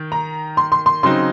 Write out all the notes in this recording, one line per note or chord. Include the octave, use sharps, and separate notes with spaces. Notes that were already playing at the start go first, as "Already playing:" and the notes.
Already playing: D#3
A#5
C6
C6
C6
C#3 F#3 C4 D#4 C6